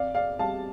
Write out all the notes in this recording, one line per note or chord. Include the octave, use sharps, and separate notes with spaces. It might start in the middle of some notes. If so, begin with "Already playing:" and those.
Already playing: F2 D5 F5
D5 F5
G3 F5 A5